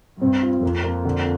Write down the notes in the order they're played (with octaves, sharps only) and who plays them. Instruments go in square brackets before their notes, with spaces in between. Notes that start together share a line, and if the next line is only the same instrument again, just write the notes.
[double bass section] G2 [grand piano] C4
[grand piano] F4
[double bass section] F2 [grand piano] A#3
[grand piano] A#3
D3